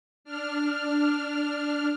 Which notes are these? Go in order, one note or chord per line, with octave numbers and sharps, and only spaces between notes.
D4 F6